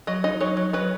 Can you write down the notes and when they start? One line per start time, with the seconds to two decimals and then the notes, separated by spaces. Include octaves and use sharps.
0.07 F#3 D#5
0.24 D#4 D#5
0.40 F#3 C#5
0.57 F#3
0.73 F#3 B4